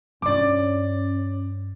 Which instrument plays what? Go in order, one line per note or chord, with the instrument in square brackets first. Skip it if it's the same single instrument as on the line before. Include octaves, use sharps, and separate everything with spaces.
[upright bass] G2 F4 [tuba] C#4 [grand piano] D5 D6